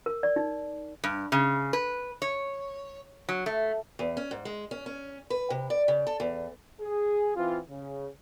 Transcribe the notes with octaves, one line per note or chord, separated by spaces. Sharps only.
A#4
D5
D#4
G2
C#3
B4
C#5
F#3
A3
E2
C#4
G#2
G#3
C#4
C#4
B4
C3
D5
C#3
A4
E2
G#4
E3 C4 F4
C#3